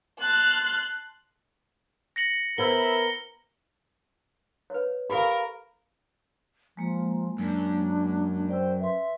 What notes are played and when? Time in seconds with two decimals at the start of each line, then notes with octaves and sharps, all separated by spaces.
0.20 A5 C6 F6 F#6
2.16 A#6 C#7 F#7
2.58 B3 E4 A#4 C5 G7
4.70 B4 C#5
5.10 G4 A4 A#4 F5 B5
6.77 F3 G#3 A#3 A#5
7.38 F#2 D4
8.49 C5 D5 G5 E6
8.80 B4 E5 C6